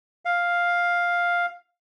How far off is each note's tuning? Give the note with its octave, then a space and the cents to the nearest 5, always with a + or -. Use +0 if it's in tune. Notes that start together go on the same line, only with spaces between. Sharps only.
F5 +5